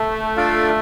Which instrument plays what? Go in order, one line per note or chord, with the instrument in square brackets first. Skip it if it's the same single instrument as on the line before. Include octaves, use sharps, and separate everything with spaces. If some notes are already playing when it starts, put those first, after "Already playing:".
Already playing: [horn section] A3
[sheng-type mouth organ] D4 F4 A4 D5 F5